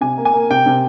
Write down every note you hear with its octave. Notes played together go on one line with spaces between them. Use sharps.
C3 G#5
A#3
G#5
A#3
C3 G5
C3